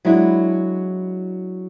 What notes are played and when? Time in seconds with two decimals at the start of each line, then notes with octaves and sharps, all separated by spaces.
0.05 F#3 G#3 D4 E4